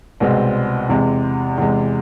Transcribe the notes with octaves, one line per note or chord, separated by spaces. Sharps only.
C2 B2 G#3 C4
E2 C3 G#3
E2 C3 G#3